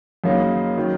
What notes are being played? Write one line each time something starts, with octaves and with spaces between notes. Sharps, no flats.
F#2 C#3 A#3 D#4
D#3 F#3